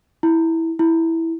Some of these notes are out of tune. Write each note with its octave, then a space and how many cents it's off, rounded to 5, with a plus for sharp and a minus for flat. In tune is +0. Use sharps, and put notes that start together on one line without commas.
E4 -10
E4 -5